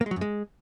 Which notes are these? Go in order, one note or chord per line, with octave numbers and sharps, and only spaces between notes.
A#3
G#3
F#3
F#2
G#3